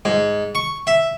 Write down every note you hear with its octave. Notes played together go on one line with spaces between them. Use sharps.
G#2
C#6
E5